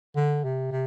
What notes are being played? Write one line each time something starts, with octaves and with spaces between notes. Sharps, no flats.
D3
C3
C3